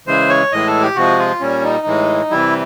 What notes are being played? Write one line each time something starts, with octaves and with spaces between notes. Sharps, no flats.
C#3 E3 G#3 C5
C#5
A2 E3 G#3 D#5
A4
G4
C3 F3 G#3 F#4
F4
A#2 G3 C#4
D#4
A2 E3 G#3
C3 E3 G3 E4